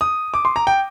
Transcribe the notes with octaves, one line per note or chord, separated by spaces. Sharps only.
D#6
D6
C6
A#5
G5